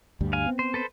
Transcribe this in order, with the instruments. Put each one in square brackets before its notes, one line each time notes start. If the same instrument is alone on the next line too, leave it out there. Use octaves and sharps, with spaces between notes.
[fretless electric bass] D2 G2 G3
[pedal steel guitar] F5 G#5
[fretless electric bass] B3 C4
[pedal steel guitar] C5
A4 B4 C5